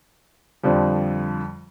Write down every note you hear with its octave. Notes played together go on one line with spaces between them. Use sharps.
F2 D3 F3 G3